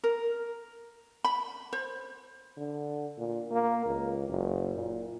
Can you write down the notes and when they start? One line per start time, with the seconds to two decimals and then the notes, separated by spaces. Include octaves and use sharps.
0.04 A#4
1.24 B5
1.73 C5
2.57 D3
3.18 A#2
3.51 A#3
3.85 C#2
4.29 F#1
4.75 A#2